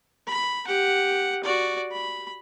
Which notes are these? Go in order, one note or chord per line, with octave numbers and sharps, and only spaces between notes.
B5
G4 F#5
F#4 D5
B5